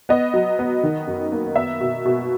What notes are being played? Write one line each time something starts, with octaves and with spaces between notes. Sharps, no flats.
B3 D#5
F#3
B3
D#3
F#2
A#3
B3 E5
B2
B2